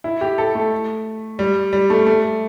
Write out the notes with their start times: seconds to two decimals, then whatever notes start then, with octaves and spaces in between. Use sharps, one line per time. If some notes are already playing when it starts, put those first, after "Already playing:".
0.04 E4
0.21 G4
0.38 A4
0.55 A3
1.39 G3
1.73 G3
1.90 A3
2.07 A3